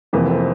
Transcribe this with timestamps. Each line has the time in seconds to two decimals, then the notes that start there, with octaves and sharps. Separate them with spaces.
0.13 F1 F2 E3 A#3
0.30 C4